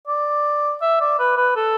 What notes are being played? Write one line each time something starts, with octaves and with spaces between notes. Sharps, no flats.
D5
E5
D5
B4
B4
A4